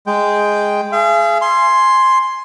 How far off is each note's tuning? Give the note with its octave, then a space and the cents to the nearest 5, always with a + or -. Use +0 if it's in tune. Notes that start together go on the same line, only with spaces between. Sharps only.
G#3 +0 G5 +0
G#4 +20 F5 -45
G#5 +10 C6 +5